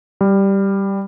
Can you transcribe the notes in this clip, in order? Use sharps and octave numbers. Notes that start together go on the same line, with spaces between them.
G3